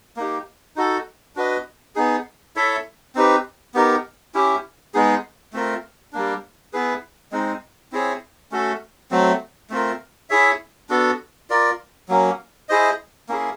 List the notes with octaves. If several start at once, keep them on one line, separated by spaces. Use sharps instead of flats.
A#3 D#4 G4
D#4 F#4 A4
D4 F#4 B4 D#5
B3 D#4 G#4
E4 A4 C#5 E5
C4 D#4 G4 B4
B3 D#4 G4 A#4
C#4 E4 G4
G#3 B3 D#4 G#4
A3 C4 F4 A#4
G3 A#3 D4
B3 E4 G#4 B4
G#3 C4 D#4
C4 E4 G#4 C#5
A3 C#4 F#4 A4
F#3 A3 C4
A3 C4 F4 A#4
E4 G#4 C#5 E5
B3 D4 F#4 A4
F4 A#4 D5
F#3 A#3 C#4
E4 G#4 C5 D#5
A#3 C#4 E4 G#4